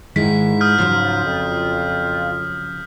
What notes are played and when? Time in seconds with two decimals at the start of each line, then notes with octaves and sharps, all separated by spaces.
0.16 G#2 D#3 G#3 E4 B6
0.61 D#6 F6 G6
0.78 C#3 F3 F#3 F4
1.25 F2